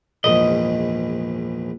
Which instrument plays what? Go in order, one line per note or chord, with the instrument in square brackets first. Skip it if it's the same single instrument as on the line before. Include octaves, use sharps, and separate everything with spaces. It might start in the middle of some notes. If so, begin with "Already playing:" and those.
[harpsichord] A#1 E2 G#2 [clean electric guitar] D#5